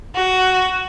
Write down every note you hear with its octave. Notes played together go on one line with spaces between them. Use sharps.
F#4